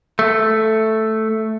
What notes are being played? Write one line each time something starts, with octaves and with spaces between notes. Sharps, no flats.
A3